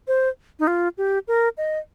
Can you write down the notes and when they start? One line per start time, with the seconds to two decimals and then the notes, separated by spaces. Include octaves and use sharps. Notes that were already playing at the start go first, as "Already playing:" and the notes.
0.08 C5
0.60 D#4
0.67 F4
0.98 G4
1.28 A#4
1.57 D#5